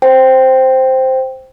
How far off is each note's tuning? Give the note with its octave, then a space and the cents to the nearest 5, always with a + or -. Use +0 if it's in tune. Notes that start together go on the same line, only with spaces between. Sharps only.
C5 +0 G5 -5